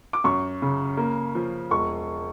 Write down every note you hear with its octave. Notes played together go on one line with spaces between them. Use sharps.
D6
F#2 C#6
C#3
A#3
F3
E1 C#6